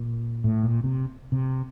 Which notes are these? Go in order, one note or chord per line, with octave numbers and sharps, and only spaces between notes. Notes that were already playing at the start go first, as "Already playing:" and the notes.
Already playing: A#2
A2
A#2
C3
C3